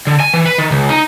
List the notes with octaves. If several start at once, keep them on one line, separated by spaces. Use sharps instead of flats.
D3
G#5
E3
B4
D#3
C#2
D#4